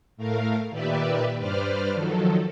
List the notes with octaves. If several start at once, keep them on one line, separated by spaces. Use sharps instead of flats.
A2 A3 A#4 F5
A#2 D#3 G4 B4 D5 E5
G2 B4 C5 D5 F6
D#3 F3 F#3 A4